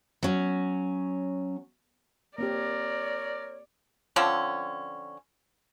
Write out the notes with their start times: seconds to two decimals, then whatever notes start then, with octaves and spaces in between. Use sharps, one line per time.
0.23 F#3 C#4
2.38 A#3 C4 G4 A#4 C#5 D5
4.16 D3 F3 C4 C#4